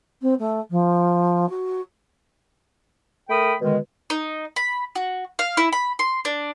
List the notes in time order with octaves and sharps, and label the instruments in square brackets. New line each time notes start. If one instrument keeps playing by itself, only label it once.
[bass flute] C4
A3
F3
F#4
[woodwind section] A3 A#4 G5 B5 D#6
B2 D3 D#3 G#3
[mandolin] D#4
B5
F#4
F5
E4
B5
C6
D4